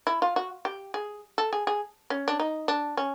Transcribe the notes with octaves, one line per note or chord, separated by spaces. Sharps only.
E4
F4
F#4
G4
G#4
A4
G#4
G#4
C#4
D4
D#4
D4
C#4